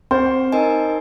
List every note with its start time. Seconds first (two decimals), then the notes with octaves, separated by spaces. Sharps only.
0.11 C4 C5
0.52 D#4 A#4 D#5 G#5